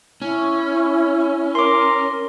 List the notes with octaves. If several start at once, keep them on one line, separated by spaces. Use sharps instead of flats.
C#4 E4
A#4 C6 D6